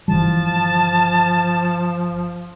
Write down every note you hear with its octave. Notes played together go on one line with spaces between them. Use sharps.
G1 E3 F3 G3 A5